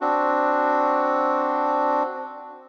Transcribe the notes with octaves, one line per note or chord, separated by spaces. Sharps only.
C4 D4 F#4